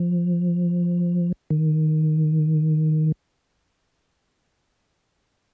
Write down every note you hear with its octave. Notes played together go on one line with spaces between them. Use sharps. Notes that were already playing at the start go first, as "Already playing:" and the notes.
Already playing: F3
D#3